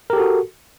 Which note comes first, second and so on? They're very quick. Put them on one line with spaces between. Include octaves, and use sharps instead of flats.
A#4 G4 A4 F#4